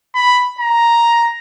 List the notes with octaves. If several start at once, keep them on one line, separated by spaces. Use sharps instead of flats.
B5
A#5